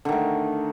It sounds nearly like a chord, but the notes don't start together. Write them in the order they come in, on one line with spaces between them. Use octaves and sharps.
D3 D#3 A3